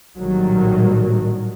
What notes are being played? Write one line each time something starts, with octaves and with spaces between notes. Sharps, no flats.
A#1 A2 D#3 F#3 G3